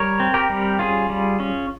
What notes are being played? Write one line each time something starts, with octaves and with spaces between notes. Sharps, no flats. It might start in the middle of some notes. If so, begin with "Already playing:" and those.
Already playing: G3 A#4 C#5
C4
G4 A#4
G3
C#4 F4 G#4
G3
C#4